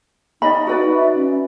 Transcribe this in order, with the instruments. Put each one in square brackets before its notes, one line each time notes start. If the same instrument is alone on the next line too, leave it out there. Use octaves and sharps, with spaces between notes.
[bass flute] D#4 [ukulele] D5 D#5 B5
[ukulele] F#4 B4 D5
[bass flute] E5
C#4